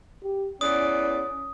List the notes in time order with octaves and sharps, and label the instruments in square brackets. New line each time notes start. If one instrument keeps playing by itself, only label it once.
[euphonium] G4
[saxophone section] E2 B4 D5 [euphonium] C#4 [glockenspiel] D#6